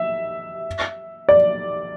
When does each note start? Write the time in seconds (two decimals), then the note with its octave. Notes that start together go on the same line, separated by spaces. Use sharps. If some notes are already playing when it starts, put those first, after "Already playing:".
Already playing: E5
1.29 D5